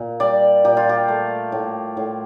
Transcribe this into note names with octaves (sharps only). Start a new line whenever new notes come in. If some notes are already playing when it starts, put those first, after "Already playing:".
Already playing: A#2
G3 D5
A#2 G4
F4
G4
A3
A2
A2